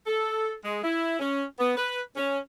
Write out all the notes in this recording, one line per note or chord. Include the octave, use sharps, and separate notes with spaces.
A4
G#3
E4
C#4
B3
B4
C#4